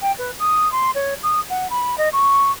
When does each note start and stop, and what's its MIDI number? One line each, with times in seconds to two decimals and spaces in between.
0.01 0.11 79
0.18 0.31 71
0.39 0.71 87
0.71 0.90 84
0.94 1.14 73
1.23 1.40 87
1.49 1.69 78
1.70 1.95 83
1.98 2.09 75
2.12 2.51 85